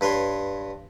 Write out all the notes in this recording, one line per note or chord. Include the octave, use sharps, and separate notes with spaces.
G2 B4 C#5 C6